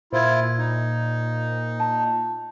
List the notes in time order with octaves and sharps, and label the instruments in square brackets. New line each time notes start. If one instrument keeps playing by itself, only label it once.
[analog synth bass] A#2 [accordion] E4 F4 [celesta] C5 G#6
[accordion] D#4
[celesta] A5